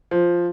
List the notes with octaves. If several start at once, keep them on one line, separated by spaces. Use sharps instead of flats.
F3